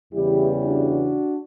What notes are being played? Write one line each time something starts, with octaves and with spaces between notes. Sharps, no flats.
E2 C#3 E3 G3 E4 G4
D4 F#4